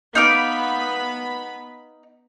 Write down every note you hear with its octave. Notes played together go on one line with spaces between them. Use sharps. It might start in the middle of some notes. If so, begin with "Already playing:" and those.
B3 D#4 F5 B5 D6